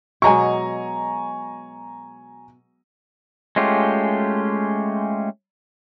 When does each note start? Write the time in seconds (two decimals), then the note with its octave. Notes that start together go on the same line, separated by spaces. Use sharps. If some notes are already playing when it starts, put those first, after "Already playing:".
0.22 B2 F#3 G#3 G#5 A#5 C#6
3.56 G#3 A3 C#4 F4 G4